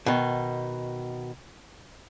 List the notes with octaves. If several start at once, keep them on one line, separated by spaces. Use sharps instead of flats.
B2 D#3